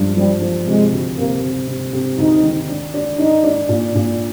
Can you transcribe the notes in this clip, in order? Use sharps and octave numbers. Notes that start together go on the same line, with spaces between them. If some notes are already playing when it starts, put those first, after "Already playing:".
Already playing: G2 F3
F3 G3
F3
C3 G#3
D2
C3 A#3
C3
C3
C3
D2 D#4
D#3
D4
D4
D4 D#4
D4
A#2
A#2